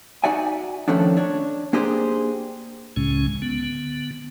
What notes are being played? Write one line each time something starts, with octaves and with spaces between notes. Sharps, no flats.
D#4 F#4 D5 E5 G#5
D#3 F3 A3 C#4 D4
D4 C#5
A#3 D4 G4 G#4 C5
C#2 A2 C#3 G#3 C#4
D3 B3